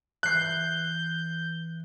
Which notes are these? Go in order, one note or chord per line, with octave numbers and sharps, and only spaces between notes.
E3 F#6 G6 C7